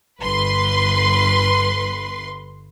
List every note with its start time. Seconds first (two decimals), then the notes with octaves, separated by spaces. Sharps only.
0.21 G1 B4 C6